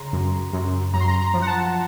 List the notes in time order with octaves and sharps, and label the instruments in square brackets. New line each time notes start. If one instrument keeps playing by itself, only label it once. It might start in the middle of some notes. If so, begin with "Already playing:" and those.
Already playing: [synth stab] C#3 A#5 C6
F#2
F#2
F#2 A#5
C6
A#5
A#5
F3
F#5
A5